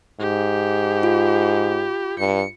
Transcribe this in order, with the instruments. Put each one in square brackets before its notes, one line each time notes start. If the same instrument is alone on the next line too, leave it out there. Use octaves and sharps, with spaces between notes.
[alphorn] G#2 [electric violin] G4
[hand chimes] F4
[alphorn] G2 [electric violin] C#7